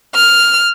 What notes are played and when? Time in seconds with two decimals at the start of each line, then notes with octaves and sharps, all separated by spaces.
0.15 F6